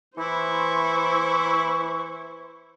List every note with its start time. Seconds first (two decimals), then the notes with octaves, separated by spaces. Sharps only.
0.17 E3 E4 C5 C#6